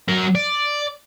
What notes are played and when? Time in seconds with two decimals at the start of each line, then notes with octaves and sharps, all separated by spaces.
0.08 F#3 A#4
0.35 D5